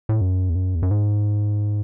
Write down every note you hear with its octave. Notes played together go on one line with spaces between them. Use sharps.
A2
F#2
E2
F#2
E2
F#2
G#2